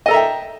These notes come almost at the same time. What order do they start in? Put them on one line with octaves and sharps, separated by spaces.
D#5 A4 A#5 E5 G5